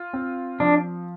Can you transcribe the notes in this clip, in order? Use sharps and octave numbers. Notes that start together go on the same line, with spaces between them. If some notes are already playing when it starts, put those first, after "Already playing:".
Already playing: F4
C4
F3 D4